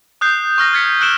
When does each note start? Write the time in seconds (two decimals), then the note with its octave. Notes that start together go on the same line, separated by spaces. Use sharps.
0.21 D#6 F#6 G6 C7
0.58 C#6 F6 A#6
0.73 F6 G#6 A6 B6 C#7
1.01 E6 F#6 C#7 D7 E7 G7